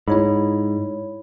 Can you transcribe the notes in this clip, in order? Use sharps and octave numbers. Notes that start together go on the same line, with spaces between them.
G#2 E4 C#5 B5